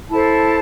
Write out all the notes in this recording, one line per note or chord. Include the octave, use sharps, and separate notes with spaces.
E4 A4 C5 A5